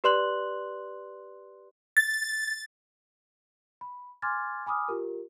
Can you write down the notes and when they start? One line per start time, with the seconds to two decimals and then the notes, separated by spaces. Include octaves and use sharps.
0.04 G4 B4 D5 C6 F#6 F#7
1.97 A6
3.81 B5
4.22 G#5 C6 D6 F6 G#6 A6
4.66 G#5 B5 D6 D#6 F6
4.88 F4 G4 A#4